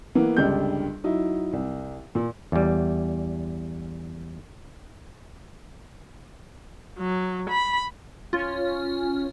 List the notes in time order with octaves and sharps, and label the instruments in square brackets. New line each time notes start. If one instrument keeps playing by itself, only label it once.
[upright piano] E3 A#3 B3
G1 C#2 G3 D4 G6
F#3 D#4 E4
C2
A#2
[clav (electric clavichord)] E2 G3
[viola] F#3
B5
[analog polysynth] C#4 [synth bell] F4